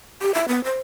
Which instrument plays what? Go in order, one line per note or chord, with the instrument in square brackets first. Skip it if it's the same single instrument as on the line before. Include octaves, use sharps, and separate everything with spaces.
[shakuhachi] G4
E5
B3
C5